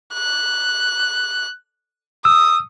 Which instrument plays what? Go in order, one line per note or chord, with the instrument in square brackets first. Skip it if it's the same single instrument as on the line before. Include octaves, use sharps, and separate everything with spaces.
[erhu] F#6
[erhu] D#6 [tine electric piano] E6